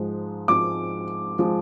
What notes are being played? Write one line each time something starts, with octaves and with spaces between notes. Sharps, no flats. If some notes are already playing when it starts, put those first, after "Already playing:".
Already playing: G#2 F3 G#3
G#2 F3 G#3 D6
F3 G#3